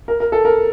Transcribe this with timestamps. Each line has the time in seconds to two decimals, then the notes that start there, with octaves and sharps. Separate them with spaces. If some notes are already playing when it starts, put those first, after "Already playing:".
0.08 A#4
0.20 A#4
0.32 A4
0.45 A#4